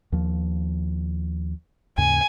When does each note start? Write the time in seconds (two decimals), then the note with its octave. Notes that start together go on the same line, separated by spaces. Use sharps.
0.12 D#2 F3
1.98 D#2 G#2 C#3 G#5